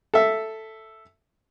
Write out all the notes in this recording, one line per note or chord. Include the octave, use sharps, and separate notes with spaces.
A4 E5